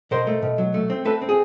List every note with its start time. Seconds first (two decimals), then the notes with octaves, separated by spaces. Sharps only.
0.11 B2 A#4 C5
0.27 A3
0.42 B2
0.58 F#3
0.74 A3
0.90 C4
1.05 A3 A4 B4
1.22 C4
1.29 G#4